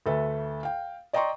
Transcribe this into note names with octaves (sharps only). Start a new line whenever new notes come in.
D2 A3 A4 B4 E5
F5 G5
D5 D#5 G5 A#5 C6 C#6